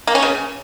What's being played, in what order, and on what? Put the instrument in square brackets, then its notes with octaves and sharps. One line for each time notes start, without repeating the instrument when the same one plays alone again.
[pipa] A#3
C#4
C#3